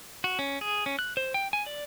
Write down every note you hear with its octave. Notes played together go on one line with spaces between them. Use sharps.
F#4
C#4
G#4
C#4
F#6
C5
G5
G#5
D5